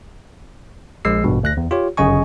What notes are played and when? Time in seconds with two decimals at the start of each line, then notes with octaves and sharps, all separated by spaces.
1.05 A#1 G#3 E6 C7
1.24 A1 G2 B2
1.43 D2 F#6 A#6
1.57 E2
1.71 F4 G4 C#5
1.97 G1 F#2 C#3 D#5 G#5 C#6